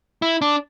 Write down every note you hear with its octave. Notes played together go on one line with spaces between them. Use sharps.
E4
D4